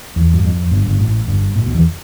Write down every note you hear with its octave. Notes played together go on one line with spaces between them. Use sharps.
E2
G2
F2
G1 G2
G1 G2
A1 A2
G1 G2
A1 A2
B1 B2
E2 E3